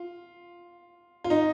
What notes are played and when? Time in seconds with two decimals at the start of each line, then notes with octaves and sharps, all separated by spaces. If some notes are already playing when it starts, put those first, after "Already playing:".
Already playing: F4
1.24 F4
1.30 D#4